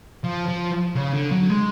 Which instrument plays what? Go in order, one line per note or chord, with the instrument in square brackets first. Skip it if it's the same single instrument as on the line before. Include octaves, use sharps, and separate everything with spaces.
[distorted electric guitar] F3
F3
C#3
D3
F#3
G#3